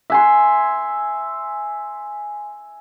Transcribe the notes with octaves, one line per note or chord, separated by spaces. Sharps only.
E5 G#5 C6